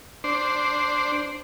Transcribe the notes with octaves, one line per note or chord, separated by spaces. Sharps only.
D4 C5